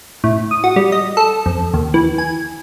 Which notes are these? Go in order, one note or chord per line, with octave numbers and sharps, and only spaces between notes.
A2
D#6
F#4
G3
D#5
A4
F2
D#2
E3
G#5